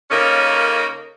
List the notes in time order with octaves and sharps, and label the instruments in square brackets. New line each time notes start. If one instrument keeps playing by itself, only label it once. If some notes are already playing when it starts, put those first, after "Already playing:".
[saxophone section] C#3 A#3 C#4 D#4 A4 A#4